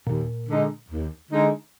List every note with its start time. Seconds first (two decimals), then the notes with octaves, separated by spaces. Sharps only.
0.07 D#2 A#2
0.48 D3 G#3 D#4
0.91 D#2
1.31 D3 G#3 D#4